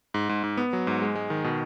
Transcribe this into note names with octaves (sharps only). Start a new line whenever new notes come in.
G#2
G#2
G#2
B3
F#3
G#2
G#3
G#3
D#3
B2